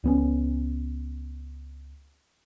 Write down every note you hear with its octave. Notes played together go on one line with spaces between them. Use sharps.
C#2 B3 C#4